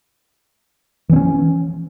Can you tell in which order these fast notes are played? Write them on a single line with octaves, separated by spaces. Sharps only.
E3 C4 C#4